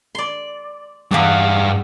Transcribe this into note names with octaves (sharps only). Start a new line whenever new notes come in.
D5 C6
E2 G2 E3 D5 F5